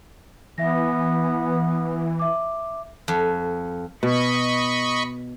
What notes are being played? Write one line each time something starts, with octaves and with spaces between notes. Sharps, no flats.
E3 B3 E5 A#6
E5 D6
F2
B2 D#5 B5 C#6